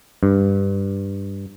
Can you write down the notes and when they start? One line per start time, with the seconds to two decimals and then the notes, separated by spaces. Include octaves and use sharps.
0.23 G2